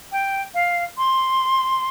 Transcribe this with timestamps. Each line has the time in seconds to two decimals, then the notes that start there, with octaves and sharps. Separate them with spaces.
0.12 G5
0.55 F5
0.98 C6